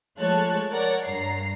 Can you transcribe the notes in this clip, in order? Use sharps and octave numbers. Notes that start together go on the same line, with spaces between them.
F3 G#3 A3 C#5 A5 F#6
A#4 C#5 D5 F#5
G2 A#5 C7